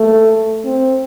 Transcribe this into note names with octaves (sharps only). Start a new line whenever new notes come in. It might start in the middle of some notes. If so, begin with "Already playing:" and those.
Already playing: A3
C4